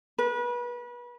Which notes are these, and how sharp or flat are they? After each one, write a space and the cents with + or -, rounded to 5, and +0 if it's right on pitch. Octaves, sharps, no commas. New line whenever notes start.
B4 -30